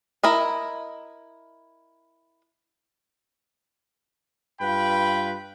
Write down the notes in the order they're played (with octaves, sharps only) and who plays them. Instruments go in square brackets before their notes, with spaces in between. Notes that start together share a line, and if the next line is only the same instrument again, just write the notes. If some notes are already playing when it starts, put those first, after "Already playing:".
[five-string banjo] E4 A#4 D#5
[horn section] G2 F4 B4 G5 B5